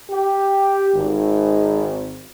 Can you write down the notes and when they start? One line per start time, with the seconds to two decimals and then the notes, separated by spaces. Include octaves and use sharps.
0.11 G4
0.95 G#1